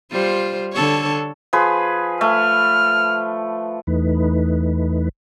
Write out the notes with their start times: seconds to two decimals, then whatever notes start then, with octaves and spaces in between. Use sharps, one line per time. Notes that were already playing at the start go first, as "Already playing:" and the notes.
0.11 G3 F4 C5
0.73 D3 A4 C#5
1.53 F3 G#4 B4
2.21 A3 F6
3.87 E2 E3 A3 D#4 B4